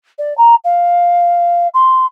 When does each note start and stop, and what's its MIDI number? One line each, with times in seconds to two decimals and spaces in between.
0.18 0.36 74
0.37 0.55 82
0.64 1.67 77
1.74 2.06 84